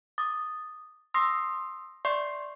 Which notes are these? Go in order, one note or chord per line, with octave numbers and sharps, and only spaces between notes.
D6 D#6 A6
C6 D#6 E6 A#6 C7
D5 E5 C6 C#6 G6 C7